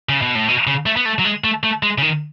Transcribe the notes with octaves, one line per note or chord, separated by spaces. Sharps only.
C#3
B2
A2
B2
C#3
A3
B3
A3
F#3
G#3
A3
A3
G#3
C#3
D#3